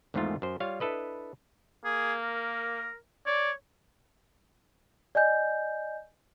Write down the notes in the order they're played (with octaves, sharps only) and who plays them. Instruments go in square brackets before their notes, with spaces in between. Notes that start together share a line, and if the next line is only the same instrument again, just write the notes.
[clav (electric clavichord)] G#1 E2 G#2 D#3 A3 F4
F#2 C5
G3 F4 C#5 F5
D4 E4 A4 B4 D#5
[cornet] A#3 [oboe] G#4
[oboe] A#4
[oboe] C#5 [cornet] D5
[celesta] D5 D#5 G#5 G6